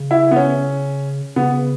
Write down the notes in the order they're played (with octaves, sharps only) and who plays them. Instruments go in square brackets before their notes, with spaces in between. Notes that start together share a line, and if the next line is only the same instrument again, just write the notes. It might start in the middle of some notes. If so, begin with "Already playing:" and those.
Already playing: [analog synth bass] C#3
[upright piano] E4
B3
C#4
[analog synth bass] C#3 [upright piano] B3